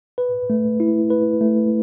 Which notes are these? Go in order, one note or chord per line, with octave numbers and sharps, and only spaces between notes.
B4
A3
E4
B4
A3